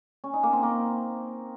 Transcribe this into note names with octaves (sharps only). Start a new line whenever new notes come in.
C#4
D#4
A#3
C4
A#3